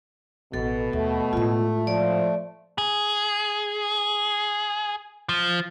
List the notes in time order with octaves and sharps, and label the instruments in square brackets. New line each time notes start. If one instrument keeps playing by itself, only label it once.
[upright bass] A1 [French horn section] B2 [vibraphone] A4
[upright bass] D#2 [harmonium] A3
[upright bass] A2 G#3 [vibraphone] F4
[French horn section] F3 [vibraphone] D5
[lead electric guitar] G#4
F3